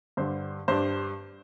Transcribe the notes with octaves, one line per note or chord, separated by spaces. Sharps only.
G2 D3 G3 C5
G2 G3 D4 C5